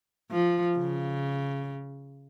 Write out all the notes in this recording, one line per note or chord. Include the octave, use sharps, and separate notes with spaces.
F3
C#3